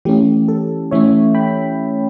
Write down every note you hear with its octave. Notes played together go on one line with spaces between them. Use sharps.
E3 A3 C#4 G4
A4
E3 A3 C#4 C#5 E5
G5 B5